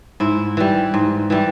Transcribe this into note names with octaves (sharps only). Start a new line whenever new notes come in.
G#2 E4
E3 G3
G#2
E3 G3